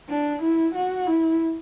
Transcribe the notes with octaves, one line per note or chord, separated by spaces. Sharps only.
D4
E4
F#4
E4